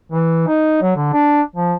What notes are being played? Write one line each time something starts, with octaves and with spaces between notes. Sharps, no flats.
E3
D#4
F#3
D3
D4
F3